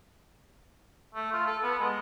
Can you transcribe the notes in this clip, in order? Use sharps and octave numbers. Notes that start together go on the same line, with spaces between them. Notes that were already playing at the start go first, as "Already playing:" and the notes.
A3
F4
A4
B3
G#3